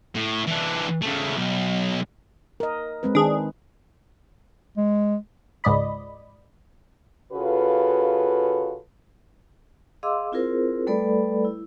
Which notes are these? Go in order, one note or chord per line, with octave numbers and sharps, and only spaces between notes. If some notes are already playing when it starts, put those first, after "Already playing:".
A2
E3 D4
C#3 A3
B1
A#4 D#5
G#3 C4 B4
D#3 D4 G#4
G#3
C#2 G#2 D5 D#5 B5
C#3 F4 F#4 A4 B4
G#4 D#5 F5 C6 D6 E6
C4 E4 F4 G#4 A#4 C5
G3 A3 A4 B4 D5 B5
E4